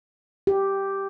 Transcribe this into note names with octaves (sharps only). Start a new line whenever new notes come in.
G4